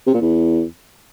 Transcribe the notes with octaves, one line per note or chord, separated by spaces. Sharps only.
C3
A#2
E2